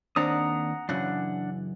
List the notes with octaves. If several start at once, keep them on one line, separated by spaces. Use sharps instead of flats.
D#2 C4 D4 F#5 A#5 D#6
F#2 C#3 E3 D4 F#5